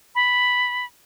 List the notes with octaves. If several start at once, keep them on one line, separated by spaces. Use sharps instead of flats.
B5